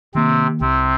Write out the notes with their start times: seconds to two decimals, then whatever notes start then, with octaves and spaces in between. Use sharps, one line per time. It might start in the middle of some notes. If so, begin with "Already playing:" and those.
0.15 C3 D#3 A#3 C4
0.61 C2 C3 C4